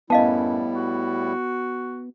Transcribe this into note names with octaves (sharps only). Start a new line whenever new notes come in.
F#2 A2 G3 B3 E4 D#5 F5 A5
F#4